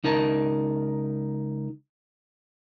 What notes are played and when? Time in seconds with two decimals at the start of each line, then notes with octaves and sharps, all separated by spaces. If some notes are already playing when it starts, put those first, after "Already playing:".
0.04 C#2 D#4 A#4 A5